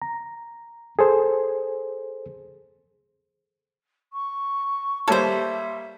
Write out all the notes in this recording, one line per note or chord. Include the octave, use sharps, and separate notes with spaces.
A#5
G#4 A4 C5
C#6
G3 A#3 A4 C5 C#5 E5